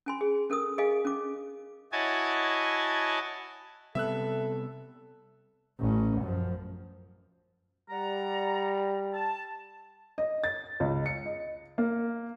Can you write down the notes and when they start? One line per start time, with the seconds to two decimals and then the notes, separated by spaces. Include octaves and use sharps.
0.06 C#4 G#5 C6
0.21 G#4
0.50 C#4 A4 A#4 D#6
0.78 G#4 D#5 F5 G#5
1.05 C#4 D6
1.92 E4 F#4 C#5 D#5 G#5 A5
3.95 C3 G3 B3 A4 E5 E6 F#6
5.80 A1 C#4
6.21 F#2 F3
7.90 G3 D5 F#5 A#5
9.13 A5
10.18 D#5
10.44 A6
10.80 C#2
11.06 C#7
11.26 D#5
11.78 A#3